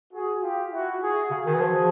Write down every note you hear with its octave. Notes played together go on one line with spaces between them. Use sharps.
F#4 G#4
F4 G4
E4 F#4
F#4 G#4
C#3 F#4 G#4
D#3
E3
F3
F3